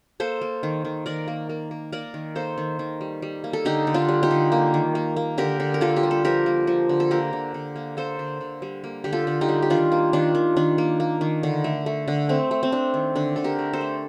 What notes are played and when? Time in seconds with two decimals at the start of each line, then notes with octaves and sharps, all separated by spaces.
0.20 A#3 A4 C5
0.41 A#3
0.63 D#3
0.85 D#3
1.06 D#3 A#4 D5
1.28 A#3
1.49 A#3
1.71 A#3
1.92 A#3 A#4 D5
2.14 D#3
2.35 A#3 A4 C5
2.58 D#3
2.79 D#3
3.01 G3
3.22 G3
3.44 A#3
3.53 A4
3.65 D3 D#4 G4
3.87 D3
3.94 D4 F4
4.08 G3
4.23 D#4 G4
4.31 D3
4.52 A#3
4.74 D#3
4.95 A#3
5.16 A#3
5.38 D3 G4 A#4
5.60 D3
5.74 A#4
5.81 A#3 F4 A4
5.96 G4
6.03 G3
6.11 A4
6.25 F3 G4 A#4
6.46 A#3
6.67 F3
6.89 D3
7.00 A4
7.11 A#3 G4 A#4
7.33 D3
7.54 D3
7.76 A#3
7.97 A#3 A4 C5
8.19 D3
8.41 D3
8.62 G3
8.84 A#3
9.04 D3 G4
9.13 F4 A4
9.27 D3
9.41 D#4 G4
9.49 G3
9.62 G4
9.70 D#3 D4 F4
9.92 A#3
10.13 D#3 D4 F4
10.35 D#3
10.56 D#3 D4
10.78 A#3
11.00 A#3
11.21 D#3
11.43 D3
11.64 A3
11.86 A3
12.08 D3
12.29 A3 C4
12.51 A3
12.63 C4
12.72 A3 D4
12.94 D#3
13.15 D3 D4
13.36 D3 A4
13.44 G4 A#4
13.59 A3
13.73 A4 C5
13.81 A3